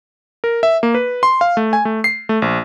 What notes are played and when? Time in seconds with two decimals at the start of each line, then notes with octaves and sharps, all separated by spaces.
0.44 A#4
0.63 E5
0.83 A#3
0.95 B4
1.23 C6
1.41 F5
1.57 A3
1.73 G#5
1.85 A3
2.04 C7
2.29 A3
2.42 A#1